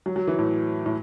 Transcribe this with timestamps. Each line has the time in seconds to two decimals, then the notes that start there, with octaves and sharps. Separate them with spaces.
0.06 F#3
0.16 F#3
0.27 E3
0.39 A2
0.86 A2